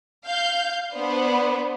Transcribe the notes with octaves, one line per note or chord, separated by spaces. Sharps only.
F5 G6
B3 D4 B4 C5 D5